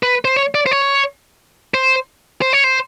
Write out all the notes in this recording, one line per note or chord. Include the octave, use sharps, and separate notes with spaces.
B4
C5
C#5
D5
C5
C#5
C5
C5
C#5
C5